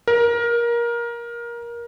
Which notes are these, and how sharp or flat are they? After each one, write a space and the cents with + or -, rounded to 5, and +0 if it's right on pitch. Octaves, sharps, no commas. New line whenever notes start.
A#4 +20